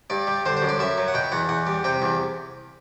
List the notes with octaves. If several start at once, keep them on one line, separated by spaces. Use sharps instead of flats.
G2 D5
G3
D3 C5
C5
F#2
D5
F#2 E5
F#3
F#5
B2 G5
E2 F#5
E2 F#5
G3
C3 G5
E2